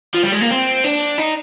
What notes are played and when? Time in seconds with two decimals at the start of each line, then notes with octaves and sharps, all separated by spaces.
0.14 F3
0.23 G3
0.32 G#3
0.41 A#3
0.50 C4
0.84 D4
1.18 D#4